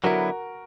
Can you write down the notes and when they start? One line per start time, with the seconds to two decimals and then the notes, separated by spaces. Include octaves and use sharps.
0.04 D3 F#3 B3 E4 F#4 A#4